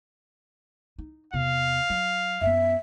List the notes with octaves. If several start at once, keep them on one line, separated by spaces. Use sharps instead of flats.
D#4
E2 C3 F5
F#3
F#2 B3 E5